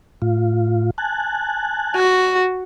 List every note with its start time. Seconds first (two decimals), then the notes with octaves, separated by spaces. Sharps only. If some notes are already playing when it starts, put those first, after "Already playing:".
0.22 A2 F4
0.98 G#5 A5 F#6
1.95 F#4